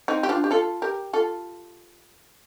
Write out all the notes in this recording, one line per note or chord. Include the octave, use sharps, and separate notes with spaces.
C4 D#4
G4
D4 F4
G4
F4 A4
G4 A#4
F4 A4